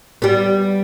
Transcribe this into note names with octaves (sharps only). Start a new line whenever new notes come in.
G3 B3